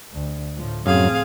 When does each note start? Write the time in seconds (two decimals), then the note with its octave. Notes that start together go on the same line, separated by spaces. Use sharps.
0.12 D2
0.55 A2 F3
0.86 F1 F#2 A2 C4 G#4 F5